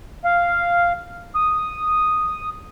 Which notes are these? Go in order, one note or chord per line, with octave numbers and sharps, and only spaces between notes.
F5
D#6